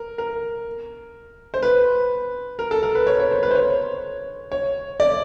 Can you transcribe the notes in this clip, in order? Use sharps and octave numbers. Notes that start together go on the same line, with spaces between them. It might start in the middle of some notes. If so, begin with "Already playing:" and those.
Already playing: A#4
A#4
C5
B4
A#4
A4
A#4
B4
C#5
C#5
C5
B4
C5
C#5
C#5
D5